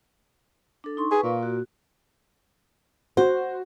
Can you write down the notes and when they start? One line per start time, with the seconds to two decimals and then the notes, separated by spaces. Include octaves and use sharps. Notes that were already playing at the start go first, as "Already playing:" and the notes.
0.84 D4 A4
0.97 D#4 C6 C#6
1.12 G#4 B4 C#6
1.23 A#2 F5
1.43 F#4
3.17 F#4 C5